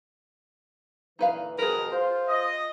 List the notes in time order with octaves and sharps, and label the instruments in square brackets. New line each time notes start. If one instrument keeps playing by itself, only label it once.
[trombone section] A#2 D3 E3 [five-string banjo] D#4 B4 F5
[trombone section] G#1 F2 B2 [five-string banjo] G#4 B4 [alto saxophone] A#4
[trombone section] F4 [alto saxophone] C5
[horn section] D#5